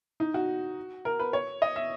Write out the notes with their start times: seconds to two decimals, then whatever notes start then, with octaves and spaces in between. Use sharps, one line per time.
0.20 D#4
0.34 F#4
1.05 A#4
1.19 B4
1.33 C#5
1.62 D#5
1.76 E5